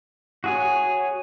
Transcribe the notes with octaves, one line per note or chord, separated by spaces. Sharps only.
F#4 G#4 C#5